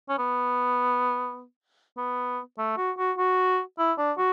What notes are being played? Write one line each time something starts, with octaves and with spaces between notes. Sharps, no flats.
C#4
B3
B3
A3
F#4
F#4
F#4
E4
D4
F#4